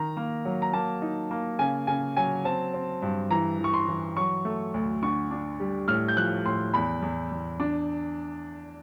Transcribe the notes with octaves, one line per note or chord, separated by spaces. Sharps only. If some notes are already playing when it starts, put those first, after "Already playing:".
Already playing: D#3 A#5
A#3
F#3
A#5
A#3 A5
D#4
A#3
C#3 G#5
C#3 G#5
F#3 G#5
C4 A5
C4
G2
E3 A#5
E3
C#6
C6
E3
F#3 C#6
A3
D2
D3 C#6
D4
G3
A2 F6
G6
F3 F#6
A2 C6
E2 B5
E2
E2
D4